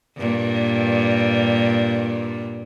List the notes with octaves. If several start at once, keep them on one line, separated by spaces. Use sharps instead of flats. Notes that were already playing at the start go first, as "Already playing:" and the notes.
G2 A#2